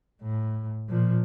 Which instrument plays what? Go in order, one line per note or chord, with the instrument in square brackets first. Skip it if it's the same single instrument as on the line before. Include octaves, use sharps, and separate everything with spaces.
[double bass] A2
A#2 F3